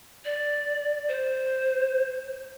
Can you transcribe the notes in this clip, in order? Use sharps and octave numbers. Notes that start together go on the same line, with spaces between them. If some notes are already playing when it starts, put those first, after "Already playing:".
D5
C5